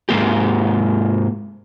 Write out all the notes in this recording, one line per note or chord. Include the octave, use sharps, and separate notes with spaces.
G#2 B2 A#3 G4